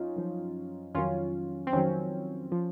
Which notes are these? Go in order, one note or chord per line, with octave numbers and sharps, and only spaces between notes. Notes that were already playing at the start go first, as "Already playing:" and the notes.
Already playing: F#2 C#4 D#4 F4
F#2 F3
F2 D#3 F#3 C#4 F4
C4
F2 D#3 F#3 C#4
F3